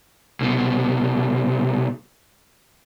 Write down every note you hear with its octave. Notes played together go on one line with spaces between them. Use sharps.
C2 B2